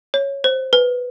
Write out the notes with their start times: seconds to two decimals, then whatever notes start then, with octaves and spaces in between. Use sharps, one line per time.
0.14 C#5
0.44 C5
0.73 B4